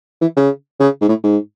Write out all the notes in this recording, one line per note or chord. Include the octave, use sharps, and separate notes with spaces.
E3
C#3
C#3
G#2
A2
G#2